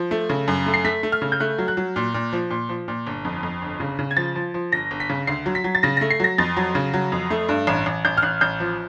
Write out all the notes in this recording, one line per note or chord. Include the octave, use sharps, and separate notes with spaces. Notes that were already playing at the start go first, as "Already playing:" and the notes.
Already playing: F3
A3
C#3
F#2
A3
C7
A3 B6
A3
F6
C#3
G6
A3 F#6
F#3
F#6
F#3
A#2
A#2
F3
A#2
F3
A#2
G1
F2
F2
G1
C#3
C#3
G#6
F3 A6
F3
F3
G1 A#6
G1
B6
C#3
D2 C7
F#3
B6
F#3
A6
C#3 A#6
A#6
A3
C7
F#3 A#6
F2 A6
F#3
C#3
F#3
F2
A3
G2
A1
A1
A1 G6
F6
A1 F#6
A1 G6
F3